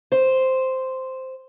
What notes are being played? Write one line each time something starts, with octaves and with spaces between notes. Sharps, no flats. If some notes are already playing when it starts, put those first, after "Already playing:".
C5